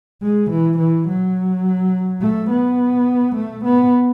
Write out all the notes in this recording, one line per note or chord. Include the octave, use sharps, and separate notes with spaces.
G#3
E3
E3
F#3
A3
B3
A3
B3